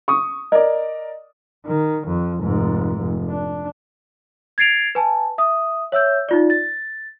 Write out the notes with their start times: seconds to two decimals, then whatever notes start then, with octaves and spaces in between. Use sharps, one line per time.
0.08 C#6 D#6
0.52 A#4 D5 D#5
1.66 D#3
2.07 F2
2.41 F1 G#2
3.00 F1
3.30 D4
4.58 G#6 A6 C7 D7 F7
4.95 B4 G#5 A5
5.38 E5 D#6
5.92 C#5 E5 E6 G6
6.29 D#4 F4 D5
6.50 A6